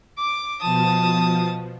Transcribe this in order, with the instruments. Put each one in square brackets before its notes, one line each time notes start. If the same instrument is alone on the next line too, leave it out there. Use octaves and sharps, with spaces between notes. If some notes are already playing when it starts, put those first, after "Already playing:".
[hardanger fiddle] D6
[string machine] B2 F3 [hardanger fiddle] A5 D#6